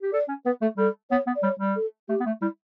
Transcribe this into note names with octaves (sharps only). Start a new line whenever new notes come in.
G4
A4 D5
C#4
B3 B4
A3 A4
G3 A4
B3 C#5
B3
D5
G3 C#5
G3
A4
A3 G4
B3
A3
G3 E4